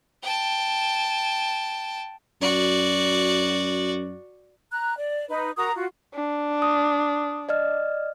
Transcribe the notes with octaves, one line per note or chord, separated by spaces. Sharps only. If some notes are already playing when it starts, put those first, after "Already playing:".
G5 A5
F#2 F#4 D5
A#5 F#6
D5
D#4 B4
F#4 A#4 A#5 D#6
F4 F#4
D4
D#6
D5 D#5 F6